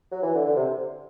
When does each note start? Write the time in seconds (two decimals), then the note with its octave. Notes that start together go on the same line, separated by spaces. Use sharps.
0.12 F#3
0.23 E3
0.34 D3
0.45 D3
0.56 C3